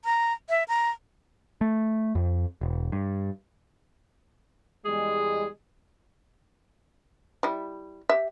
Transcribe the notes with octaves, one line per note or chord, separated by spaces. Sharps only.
A#5
E5
A#5
A3
F2
E1
G2
E2 G3 G#3 G#4
G3 E4
G4 E5